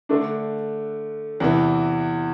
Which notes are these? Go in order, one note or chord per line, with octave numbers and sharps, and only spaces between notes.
D3 A3 D4
E2 C3 E3